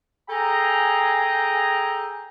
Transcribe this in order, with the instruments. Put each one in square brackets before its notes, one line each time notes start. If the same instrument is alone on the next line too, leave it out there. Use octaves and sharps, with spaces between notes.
[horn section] G#4 A4 G5 G#5 A#5